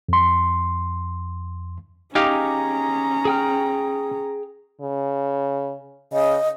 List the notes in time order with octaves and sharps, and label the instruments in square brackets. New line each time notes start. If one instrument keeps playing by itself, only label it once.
[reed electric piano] F2 C6
[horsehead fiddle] C#4 A#5 [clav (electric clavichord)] D#4 G4 F5 [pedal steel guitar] G#4 D6
[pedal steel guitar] G#4 G5 F6
[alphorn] C#3
[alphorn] C#3 [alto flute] D#5